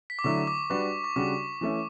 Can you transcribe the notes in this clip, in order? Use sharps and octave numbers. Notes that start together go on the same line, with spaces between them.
B6
D6
D3 F#3 A3 E4 C#6
D6
G3 D4 F#4 B4 C#6
C#6
C#3 G3 D4 F#4 D6
E3 A3 C#4